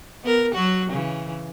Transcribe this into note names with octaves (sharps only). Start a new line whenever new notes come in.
B3 A#4
F#3 F#4
C#3 E3